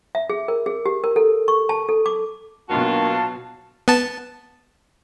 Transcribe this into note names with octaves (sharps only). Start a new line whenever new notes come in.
E5
G#4
A#4
G#4
G4
A#4
A4
C#6
A5
A4
D6
B2 D#3 F#3 A#3 D4 F4 F#4 A5
B3 A5